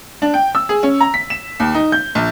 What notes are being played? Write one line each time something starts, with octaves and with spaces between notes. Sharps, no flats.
D4
G5
E6
G#4
C#4
A#5
B6
E7
D#2
D#4
G6
A#1